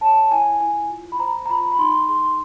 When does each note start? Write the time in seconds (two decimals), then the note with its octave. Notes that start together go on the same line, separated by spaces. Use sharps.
0.01 C#5 A5
0.31 E4 G#5
0.60 E4 G#5
0.90 F4
1.12 B5
1.19 C5 A#5
1.46 A#5
1.50 F4 B5
1.72 B5
1.79 D#4 C6
2.09 G#4 C6